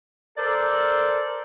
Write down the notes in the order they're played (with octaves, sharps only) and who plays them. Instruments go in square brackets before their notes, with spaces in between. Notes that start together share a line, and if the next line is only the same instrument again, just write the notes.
[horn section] A4 A#4 C5 D5